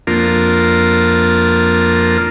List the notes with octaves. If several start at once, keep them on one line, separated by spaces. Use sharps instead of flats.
F2 A#3 D4 F4 A#4